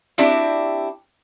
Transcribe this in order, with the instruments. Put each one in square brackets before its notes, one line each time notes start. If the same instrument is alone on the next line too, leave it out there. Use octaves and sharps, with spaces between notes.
[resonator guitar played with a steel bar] C4 D4 E4 F#4 G4